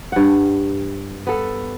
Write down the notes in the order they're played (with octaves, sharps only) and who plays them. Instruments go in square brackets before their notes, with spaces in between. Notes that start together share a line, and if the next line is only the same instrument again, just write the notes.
[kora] G2 F#5
B3 A4